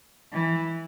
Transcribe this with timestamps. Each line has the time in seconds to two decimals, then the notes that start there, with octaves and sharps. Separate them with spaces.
0.33 E3